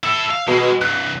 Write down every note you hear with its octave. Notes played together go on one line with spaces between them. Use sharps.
E4 A4 E6
F5
B2 G#3
C2 G2 F#6